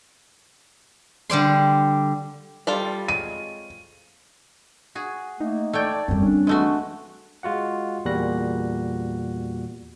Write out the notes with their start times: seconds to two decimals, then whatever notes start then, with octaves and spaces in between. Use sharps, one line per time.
1.30 D3 G3 D5 C6
2.67 G3 F4 A4 D5
3.08 G#3 C4 C#5 D#7
4.95 F#4 G#4
5.40 A3 A#3 D#4
5.73 A3 C#5 D5 G5
6.08 F#2 G3 C4
6.23 C#4 D4
6.47 E3 G#3 A3 F#4
7.43 G#3 F4 F#4 F#5
8.05 E2 A#2 G3 F#4 F#6 A#6